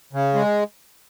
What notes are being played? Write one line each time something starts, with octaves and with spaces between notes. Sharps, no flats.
C#3
G#3